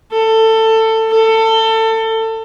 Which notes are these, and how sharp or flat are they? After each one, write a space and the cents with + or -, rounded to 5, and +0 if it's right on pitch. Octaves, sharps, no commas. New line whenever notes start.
A4 +20
A4 +25